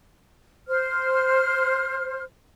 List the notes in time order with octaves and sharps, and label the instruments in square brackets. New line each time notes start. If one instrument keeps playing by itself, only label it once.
[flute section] C5 F6